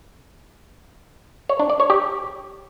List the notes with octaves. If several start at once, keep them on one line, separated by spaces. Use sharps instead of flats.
C#5
D4
D5
C#5
G4